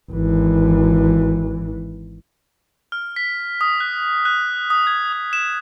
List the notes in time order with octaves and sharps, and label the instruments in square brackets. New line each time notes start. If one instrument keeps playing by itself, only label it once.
[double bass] G#1 E3
[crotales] F6
B6
D#6
F#6
F#6
D#6
G#6
D#6
E7